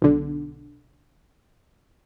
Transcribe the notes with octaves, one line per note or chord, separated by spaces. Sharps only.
B1 D3